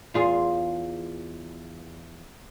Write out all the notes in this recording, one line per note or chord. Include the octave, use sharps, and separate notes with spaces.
E2 F4 G#4